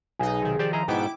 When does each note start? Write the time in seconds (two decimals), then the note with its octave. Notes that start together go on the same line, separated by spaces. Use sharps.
0.19 B1 B2 D#4 G#4
0.41 C3 D#3
0.59 D#3 F3 G4 C5 D5
0.73 E4 G#4 D#5 A#5
0.88 G#2 B2 B3 E4 G5 D6